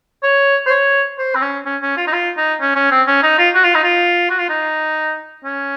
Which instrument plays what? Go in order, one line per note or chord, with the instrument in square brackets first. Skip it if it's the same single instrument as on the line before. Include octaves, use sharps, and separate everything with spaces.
[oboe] C#5
C5
C#5
C5
C4
C#4
C#4
C#4
F4
D#4
F4
D#4
C#4
C#4
C4
C#4
D#4
F4
F#4
F4
D#4
F4
F#4
F4
D#4
C#4